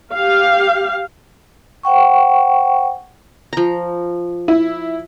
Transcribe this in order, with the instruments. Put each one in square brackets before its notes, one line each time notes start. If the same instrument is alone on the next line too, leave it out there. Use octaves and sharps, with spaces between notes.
[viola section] G4 F5
[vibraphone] C5 F#5 G5 C#6
[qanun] F3 A#5
[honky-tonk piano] E4